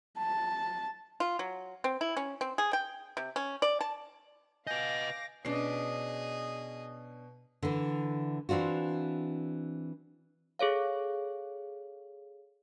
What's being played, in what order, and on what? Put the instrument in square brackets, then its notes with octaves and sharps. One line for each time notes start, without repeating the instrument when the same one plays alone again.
[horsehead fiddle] A5
[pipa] F4
F#3
C4
E4
C#4
C4
G#4
G5
C3
C#4
D5
A5
[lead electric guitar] B4 D#5 [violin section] F5 D6 [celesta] G#5 G6 [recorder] A#6
[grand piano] B2 C7 [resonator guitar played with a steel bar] C#4 D4 [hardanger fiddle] G#4 D#5
[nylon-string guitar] D3 E3
E3 C4 D4 F4 F#4
[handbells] G#4 A4 C#5 F5